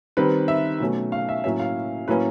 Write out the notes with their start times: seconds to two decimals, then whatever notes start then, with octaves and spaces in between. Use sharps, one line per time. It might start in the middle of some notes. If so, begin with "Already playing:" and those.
0.17 D#3 G3 C4 B4
0.48 E5
0.80 B2 F#3 A3 C#4
1.12 F5
1.29 E5
1.44 A2 F#3 A#3 C#4 E5
1.59 F5
2.08 A2 F#3 A#3 C#4 B4